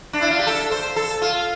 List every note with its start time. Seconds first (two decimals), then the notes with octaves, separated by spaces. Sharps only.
0.13 D4
0.21 E4
0.30 F4
0.39 G4
0.47 A4
0.71 C5
0.96 A4
1.21 F4